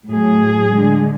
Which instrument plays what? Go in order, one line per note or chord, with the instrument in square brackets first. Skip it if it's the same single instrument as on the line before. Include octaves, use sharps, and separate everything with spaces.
[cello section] A2 F#3 A3 G#4
D3 G#3